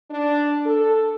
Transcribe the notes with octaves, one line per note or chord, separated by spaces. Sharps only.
D4
A4